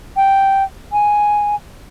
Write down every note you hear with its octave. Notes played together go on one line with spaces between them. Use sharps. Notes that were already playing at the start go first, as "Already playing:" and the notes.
G5
G#5